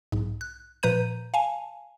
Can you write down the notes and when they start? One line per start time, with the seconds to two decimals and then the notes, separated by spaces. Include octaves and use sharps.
0.12 B1 G#2
0.41 F#6
0.83 A#2 F3 B4 A#5 G6 D#7
1.34 F5 G#5 A5